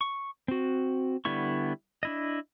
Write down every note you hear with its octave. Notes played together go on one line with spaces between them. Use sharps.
C#6
C4 F#4
D3 G3 B3 E4 C#6
D4 E4 D#5